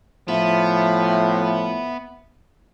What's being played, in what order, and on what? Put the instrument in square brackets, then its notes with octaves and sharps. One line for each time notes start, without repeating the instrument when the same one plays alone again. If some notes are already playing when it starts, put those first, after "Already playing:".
[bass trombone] A2 [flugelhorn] F3 [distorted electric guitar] B3 [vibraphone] E5